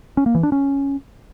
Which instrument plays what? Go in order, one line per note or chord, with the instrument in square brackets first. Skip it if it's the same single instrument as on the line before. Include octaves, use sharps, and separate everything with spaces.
[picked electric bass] C#4
A#3
E3
D4
C#4